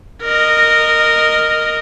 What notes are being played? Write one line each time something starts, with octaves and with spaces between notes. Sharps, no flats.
A#4 D#5